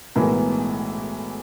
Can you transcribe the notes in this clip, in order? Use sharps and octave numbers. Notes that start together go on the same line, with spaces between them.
B1 A2 E3 G#3 B3 A#4